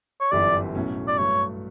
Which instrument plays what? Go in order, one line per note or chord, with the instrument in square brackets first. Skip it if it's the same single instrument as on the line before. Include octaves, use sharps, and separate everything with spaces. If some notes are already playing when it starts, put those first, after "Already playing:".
[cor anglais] C#5
[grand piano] G1 F#2 E3 G3 [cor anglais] D5
[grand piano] B1 A2 F#3 C#4
[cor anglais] D5
[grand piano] G2 F#3 A3 [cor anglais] C#5